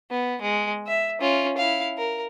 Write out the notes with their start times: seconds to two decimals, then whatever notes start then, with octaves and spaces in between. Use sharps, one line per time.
0.11 B3
0.41 G#3
0.87 E5
1.21 C#4 F4
1.57 E4 F5
1.98 A#4